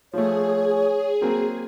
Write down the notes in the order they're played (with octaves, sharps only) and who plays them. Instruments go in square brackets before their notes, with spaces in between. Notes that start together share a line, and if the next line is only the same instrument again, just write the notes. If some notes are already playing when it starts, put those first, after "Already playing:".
[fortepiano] F3 A3 [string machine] G#4 [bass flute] C#5
[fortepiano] F#3 A#3 C4